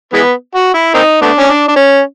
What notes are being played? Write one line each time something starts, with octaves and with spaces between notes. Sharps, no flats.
E3 G#3 B3
F#4
E4
A#3 C4 D#4
A3 B3 D4
C#4
D4
D4
C#4